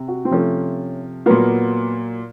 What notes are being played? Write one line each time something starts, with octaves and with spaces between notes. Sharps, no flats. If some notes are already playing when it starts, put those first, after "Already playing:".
Already playing: C3
F#4
C4
C3 F3 A3 C#4
A#2 F#3 A#3 B3